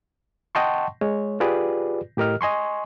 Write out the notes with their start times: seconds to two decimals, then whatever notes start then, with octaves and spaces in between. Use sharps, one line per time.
0.55 D#5 F#5 G5 A5 C6 C#6
1.01 G#3 C#5
1.40 F4 G4 G#4 B4 D5
2.17 A2 G4 A#4 D#5 F6
2.41 D#5 G#5 C6 C#6